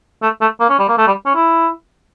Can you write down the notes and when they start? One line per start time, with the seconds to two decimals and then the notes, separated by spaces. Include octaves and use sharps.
0.22 A3
0.41 A3
0.60 A#3
0.70 C#4
0.79 G3
0.88 A#3
0.98 A3
1.07 G3
1.26 C#4
1.35 E4